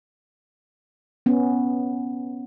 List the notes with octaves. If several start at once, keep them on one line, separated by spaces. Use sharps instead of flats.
B3 C#4